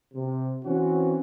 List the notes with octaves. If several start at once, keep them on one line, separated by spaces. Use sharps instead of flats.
C3
E3 C4 C#4 F#4